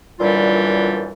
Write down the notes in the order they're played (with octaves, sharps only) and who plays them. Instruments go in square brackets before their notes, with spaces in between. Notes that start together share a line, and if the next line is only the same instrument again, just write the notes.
[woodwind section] F#2 A#2 D3 E3 G3 F4